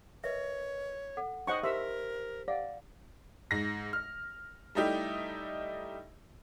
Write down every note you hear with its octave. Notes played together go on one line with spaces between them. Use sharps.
A#4 B4 C#5 D#5 E5
A4 F#5
D#4 C5 D#5 F#5 G5 C#6
G4 A#4 C5 E5 C6 B6
D5 F5 F#5
G#2 A#6
F6
G3 A3 D#4 E4 G4